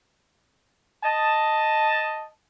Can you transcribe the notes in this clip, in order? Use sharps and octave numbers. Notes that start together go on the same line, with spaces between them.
D#5 A5